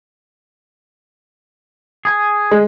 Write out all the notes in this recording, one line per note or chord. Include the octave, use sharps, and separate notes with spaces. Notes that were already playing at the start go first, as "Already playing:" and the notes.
G#4 G#5
G#3